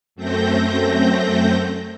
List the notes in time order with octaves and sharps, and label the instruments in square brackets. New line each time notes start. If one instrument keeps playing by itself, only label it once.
[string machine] F#2 A3 C4 G6 A#6